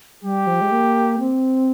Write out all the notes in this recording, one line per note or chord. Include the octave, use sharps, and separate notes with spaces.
G3 G4
F3
G#3
A#3
C4